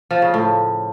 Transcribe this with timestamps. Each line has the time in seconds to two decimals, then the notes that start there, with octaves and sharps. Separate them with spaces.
0.11 F3
0.22 C#3
0.34 A2